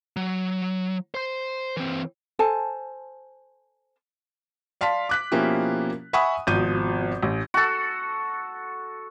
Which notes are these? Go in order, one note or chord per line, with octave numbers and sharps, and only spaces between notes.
F#3
C5 C6
E3 C4
A4 C5 G#5 A5
D5 F5 A5 C6 B6
D6 F#6 B6
B2 F3 A#3 C#4 E4 G4
E5 F#5 G#5 B5 C#6 D#6
G#1 B2 F3 G6 D#7
A1
F#4 A4